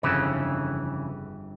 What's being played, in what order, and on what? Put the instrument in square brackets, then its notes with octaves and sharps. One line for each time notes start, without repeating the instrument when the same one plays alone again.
[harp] G1 E6 E7 [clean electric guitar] F2 C#3 E3